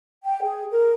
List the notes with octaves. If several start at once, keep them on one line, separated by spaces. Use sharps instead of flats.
G5
G#4
A#4